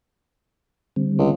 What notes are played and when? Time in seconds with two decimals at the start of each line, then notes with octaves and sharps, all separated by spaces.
0.96 D3 G3 C4
1.18 C#2